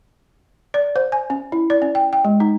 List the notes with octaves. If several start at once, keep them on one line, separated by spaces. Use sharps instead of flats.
D5
C5
G#5
C#4
E4
D5
C#4
G5
G5
G#3
D#4